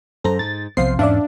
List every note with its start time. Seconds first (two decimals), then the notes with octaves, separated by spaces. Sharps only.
0.24 F#2 A4 C5 A#5
0.39 G#2 A6
0.77 B1 C3 F3 B3 C5 F5 C7
0.99 E2 G#2 C#4 D4 D5 E5 F5